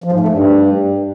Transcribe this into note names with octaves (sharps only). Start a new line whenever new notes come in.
F3
G#2
A3
G2